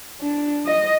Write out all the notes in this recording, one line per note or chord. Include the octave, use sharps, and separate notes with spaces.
D4
D#5